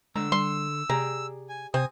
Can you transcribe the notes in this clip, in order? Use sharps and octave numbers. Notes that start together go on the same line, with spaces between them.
D3 G#3 A#5 E6
G3 C6
C3 G4 G#4 D5 A#5
G#5
C3 C4 G#5 D#6